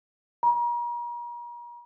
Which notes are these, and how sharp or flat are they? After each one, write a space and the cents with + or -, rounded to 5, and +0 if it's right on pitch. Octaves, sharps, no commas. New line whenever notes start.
A#5 +40